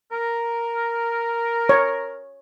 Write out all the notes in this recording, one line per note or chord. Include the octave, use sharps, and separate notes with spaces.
A#4
C#5